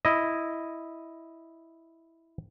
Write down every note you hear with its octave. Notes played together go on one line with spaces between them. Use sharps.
E4 D#5